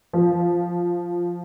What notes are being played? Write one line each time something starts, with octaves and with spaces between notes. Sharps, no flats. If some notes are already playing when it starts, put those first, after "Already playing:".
F3